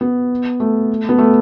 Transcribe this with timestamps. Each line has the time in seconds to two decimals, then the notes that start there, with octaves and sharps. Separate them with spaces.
0.01 B3
0.60 A3
1.09 B3
1.18 A3